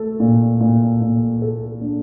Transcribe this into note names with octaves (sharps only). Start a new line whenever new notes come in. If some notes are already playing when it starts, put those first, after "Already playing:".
Already playing: A3 A4
A#2
A#2
A#2
A4
D4